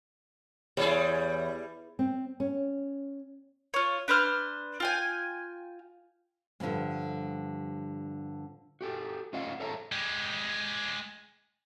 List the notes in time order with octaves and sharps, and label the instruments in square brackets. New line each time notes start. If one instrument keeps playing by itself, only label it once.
[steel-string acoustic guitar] E2 [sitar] G3 E4 G#4 [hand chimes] C#5
[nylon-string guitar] C4
C#4
[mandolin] F4 C#5
D4 B4 C5 F6
F4 G5 G#5
[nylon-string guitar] G2 D3 F3 G3 G#3
[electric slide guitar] F#4 G4 A4
A3 C#4 F4 D#5 F5 F#5
G#4 A4 C#5 E5 A5 A#5
[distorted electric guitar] G#3 G4